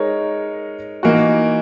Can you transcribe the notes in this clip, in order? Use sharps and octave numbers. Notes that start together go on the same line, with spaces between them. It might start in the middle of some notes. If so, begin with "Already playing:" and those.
Already playing: G#3 D#4 A#4 C#5
E3 A#3 D#4 F#4